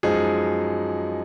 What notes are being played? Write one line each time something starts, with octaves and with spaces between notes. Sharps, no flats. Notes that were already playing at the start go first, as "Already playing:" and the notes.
F#2 F3 G#3 D#4 G#4